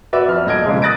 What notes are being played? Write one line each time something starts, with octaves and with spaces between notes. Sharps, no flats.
F#4 B4 D5 E5
F2 F6
D#1 D#5 G#6 D7
F2 C#3 G#3
D#6 F#6 A6 A#6 D7